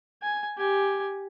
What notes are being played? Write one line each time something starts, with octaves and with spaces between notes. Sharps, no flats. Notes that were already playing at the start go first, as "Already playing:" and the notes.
G#5
G4 G#5